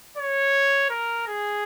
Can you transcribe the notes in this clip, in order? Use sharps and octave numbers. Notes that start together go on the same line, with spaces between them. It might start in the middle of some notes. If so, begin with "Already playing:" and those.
C#5
A#4
G#4